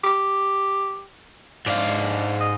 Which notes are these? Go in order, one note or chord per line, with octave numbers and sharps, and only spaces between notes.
G4
G#2 D4 F5
D#5